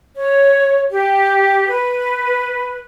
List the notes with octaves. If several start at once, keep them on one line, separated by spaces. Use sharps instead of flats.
C#5
G4
B4